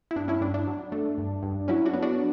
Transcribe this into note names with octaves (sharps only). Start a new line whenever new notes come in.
E4
G2 D4
C#4 E4
G2 D4
D4
F#3
A3
G2
G2
F#3 C#4 E4
D4 F#4
B3
D4 F#4